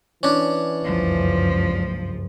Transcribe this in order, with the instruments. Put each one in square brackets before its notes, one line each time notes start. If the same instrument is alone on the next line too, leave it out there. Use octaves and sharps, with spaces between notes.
[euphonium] E3 [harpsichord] C#4 D4
[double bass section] F#1 C#2 G2 [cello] F3